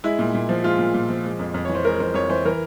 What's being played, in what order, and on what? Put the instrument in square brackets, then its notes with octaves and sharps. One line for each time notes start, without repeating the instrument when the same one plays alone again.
[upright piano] G#3 E4
A#2
A#2
F3
G#3 F4
A#2
A#2
F3
G#3
F2
F2
E3 C#5
C5
G#3 A#4
F2 C5
F2 C#5
E3 C5
E3 A#4